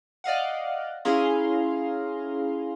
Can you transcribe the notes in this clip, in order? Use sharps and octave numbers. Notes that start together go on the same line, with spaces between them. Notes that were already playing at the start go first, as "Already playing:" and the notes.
D5 D#5 F5 F#5
C#4 E4 G#4 F5 A#5 C6